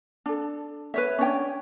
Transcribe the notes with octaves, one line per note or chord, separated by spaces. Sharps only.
D4 A4
B4 C#5 E5
C#4 D4 C#5 G5